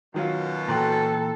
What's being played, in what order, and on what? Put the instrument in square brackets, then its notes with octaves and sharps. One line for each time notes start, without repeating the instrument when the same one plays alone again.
[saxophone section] F#2 B2 [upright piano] D#3 F#3 F4
[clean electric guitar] A#2 E3 G5 [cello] A4 [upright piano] A#5 C6 F#6